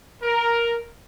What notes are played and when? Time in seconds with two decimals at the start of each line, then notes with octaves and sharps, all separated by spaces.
0.21 A#4